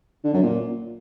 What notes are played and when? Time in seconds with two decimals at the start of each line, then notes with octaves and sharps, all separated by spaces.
0.24 D3
0.33 F#2
0.43 A#2